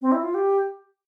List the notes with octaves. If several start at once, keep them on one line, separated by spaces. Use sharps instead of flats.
C4
E4
F4
G4